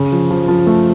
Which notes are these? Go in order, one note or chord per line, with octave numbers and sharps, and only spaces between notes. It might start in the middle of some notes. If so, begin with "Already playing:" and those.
Already playing: C#3
F3
F3
F3
A3